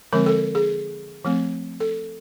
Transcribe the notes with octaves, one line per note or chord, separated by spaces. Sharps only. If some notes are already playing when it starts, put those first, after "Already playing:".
D3 F3 G#3 C4 A#4
A4
G#4
F3 A3 C4
A4